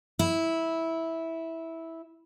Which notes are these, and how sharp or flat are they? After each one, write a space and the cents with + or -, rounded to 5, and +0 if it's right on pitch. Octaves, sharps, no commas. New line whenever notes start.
E4 -10